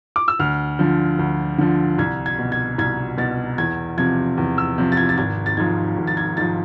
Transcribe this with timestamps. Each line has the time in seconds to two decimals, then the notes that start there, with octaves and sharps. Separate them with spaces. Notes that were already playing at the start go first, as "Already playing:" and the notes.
0.16 D6
0.28 E6
0.39 D2 F6
0.79 D3 F3
1.19 D2
1.58 D3 F3
1.98 C2 G#6
2.26 G#6
2.38 B2
2.52 G#6
2.78 C2 G#6
3.18 B2 A6
3.58 E2 G#6
3.98 C3 F3 G#6
4.38 E2
4.58 E6
4.78 C3 F3
4.92 A6
4.97 G#6
5.09 A6
5.18 G#1 G#6
5.46 A6
5.57 G#2 F3 G#6
5.97 G#1
6.07 A6
6.17 G#6
6.37 G#2 F3 A6